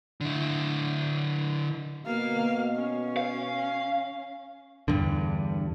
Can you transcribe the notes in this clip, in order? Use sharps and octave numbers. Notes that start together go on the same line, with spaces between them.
D3 E4
B2 A#3 F5
C#4
F5
E2 G2 D3